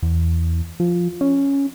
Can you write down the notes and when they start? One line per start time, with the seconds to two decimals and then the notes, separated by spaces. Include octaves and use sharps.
0.02 E2
0.80 F3
1.21 C#4